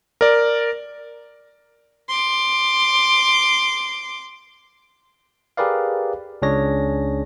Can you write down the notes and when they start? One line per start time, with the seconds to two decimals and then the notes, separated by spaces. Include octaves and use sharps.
0.21 A#4 D5
2.08 C6 D6
5.57 G4 G#4 A#4 B4 D5 F5
6.42 C#2 C#4 D4 G#4 C#5 A#6